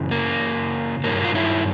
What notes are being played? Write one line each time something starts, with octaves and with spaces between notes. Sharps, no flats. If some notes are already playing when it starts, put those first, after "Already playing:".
Already playing: F#2 C#3 E3
A#3
G2 D#3 F#3 A#3
F4
E4